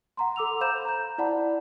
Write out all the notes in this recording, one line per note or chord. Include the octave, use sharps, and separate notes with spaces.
F#5 A#5 C6
A4 D6 E6 F7
C5 F5 A#5 B5 G6 E7
A#5 G6
E4 D5 F#5 A5 B5